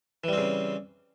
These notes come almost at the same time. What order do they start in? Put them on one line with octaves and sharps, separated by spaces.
E3 G3 C4 C#3